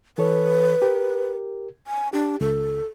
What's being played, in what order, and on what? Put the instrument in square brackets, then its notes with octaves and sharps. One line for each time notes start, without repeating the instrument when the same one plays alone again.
[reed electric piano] E3 A4 C#5 [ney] B4
[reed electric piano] G4 A#4
[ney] G#5
[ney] D4 [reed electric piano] G4
[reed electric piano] C#2 [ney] A4